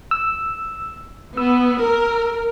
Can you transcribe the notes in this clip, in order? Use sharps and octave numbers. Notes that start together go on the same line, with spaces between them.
E6
B3 E6
A#4